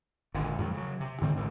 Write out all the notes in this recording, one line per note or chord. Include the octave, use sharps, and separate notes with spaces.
G#1 A#2 D3
F2 G#2 D#3 F#3
C#3 F#3
C3
G#2 D3 E3 C4
A1 G#2 D3 C4